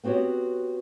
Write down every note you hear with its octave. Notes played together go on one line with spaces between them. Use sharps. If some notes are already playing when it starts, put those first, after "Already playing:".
B3 C4 F#4 G4 C#5